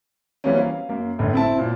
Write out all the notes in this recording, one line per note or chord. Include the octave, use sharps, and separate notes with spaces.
E3 F#3 G3 A#3 C4 C#4
F5
F#2 A#3
G1 A2
C4 E4 A5
F#2 A#2